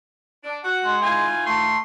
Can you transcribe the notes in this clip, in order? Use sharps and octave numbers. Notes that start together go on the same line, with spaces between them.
D4
F#4 F#5
G#3
D#3 E4 F4 G#5
A3 C6